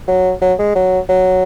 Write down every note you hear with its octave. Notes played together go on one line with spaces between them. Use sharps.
F#3
F#3
G#3
F#3
F#3